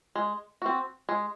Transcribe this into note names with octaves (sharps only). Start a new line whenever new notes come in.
G#3
C4 F#4
G#3